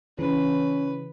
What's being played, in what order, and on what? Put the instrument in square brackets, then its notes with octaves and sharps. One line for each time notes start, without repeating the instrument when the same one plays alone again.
[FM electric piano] C#3 E3 [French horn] C#4 [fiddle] B4